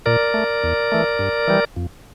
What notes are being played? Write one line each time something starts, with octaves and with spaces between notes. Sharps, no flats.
A#2 A#4 D5
A3
E2
E3 A3
G2
E3 G3
F2